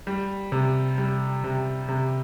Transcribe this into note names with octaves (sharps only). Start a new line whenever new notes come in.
G3
C3
G3
C3
C3